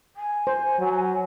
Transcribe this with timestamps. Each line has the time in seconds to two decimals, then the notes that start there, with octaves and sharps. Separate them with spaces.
0.16 G#5
0.47 C5
0.79 F#3